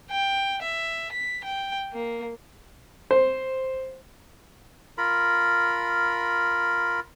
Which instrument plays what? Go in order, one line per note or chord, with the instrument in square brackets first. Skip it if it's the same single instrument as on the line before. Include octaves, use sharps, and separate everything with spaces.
[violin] G5
E5
B6
G5
A#3
[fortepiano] C5
[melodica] F4 A#4 B5